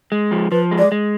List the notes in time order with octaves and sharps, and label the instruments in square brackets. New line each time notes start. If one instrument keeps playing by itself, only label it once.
[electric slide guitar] G#3
F3
[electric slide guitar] F3 [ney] B4
[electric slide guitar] G#3
[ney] D5
[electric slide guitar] G#3